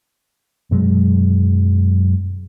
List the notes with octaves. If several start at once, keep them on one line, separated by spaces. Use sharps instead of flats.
F#2 B2 F#3 G#3